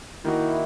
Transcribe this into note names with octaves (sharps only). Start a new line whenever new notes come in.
D#3 A#3 D#4 E4 F#4